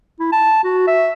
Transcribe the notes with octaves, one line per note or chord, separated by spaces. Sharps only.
E4
A5
F#4
E5